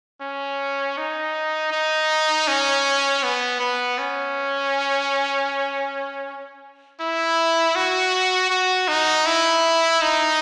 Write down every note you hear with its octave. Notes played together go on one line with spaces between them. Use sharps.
C#4
D#4
D#4
C#4
B3
B3
C#4
E4
F#4
F#4
D#4
E4
D#4